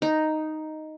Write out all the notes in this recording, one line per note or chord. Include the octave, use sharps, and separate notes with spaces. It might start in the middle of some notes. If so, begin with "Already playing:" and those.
D#4